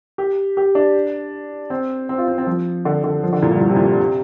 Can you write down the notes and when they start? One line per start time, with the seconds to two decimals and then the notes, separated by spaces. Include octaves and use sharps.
0.18 G4
0.57 G4
0.75 D4
1.70 C4
2.09 C4
2.18 F4
2.28 C4
2.38 C4
2.47 F3
2.85 D3
3.04 D3
3.23 F3
3.33 D3
3.42 A#2
3.52 G2
3.61 A#2
3.69 C3
3.76 A#2
3.99 C3